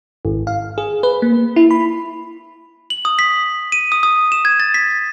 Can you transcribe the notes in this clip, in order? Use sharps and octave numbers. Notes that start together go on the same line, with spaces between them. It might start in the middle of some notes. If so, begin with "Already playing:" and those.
G#1
F5
G#4
B4
A#3
E4
B5
F#7
D#6
B6
D#7
D#6
D#6
E7
G#6
A6
B6